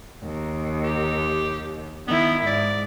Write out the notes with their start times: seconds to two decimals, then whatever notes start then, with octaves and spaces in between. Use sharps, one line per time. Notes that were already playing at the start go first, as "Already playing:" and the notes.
0.24 D#2
0.84 G4
2.08 D#3 B3 E4
2.47 G#2 D5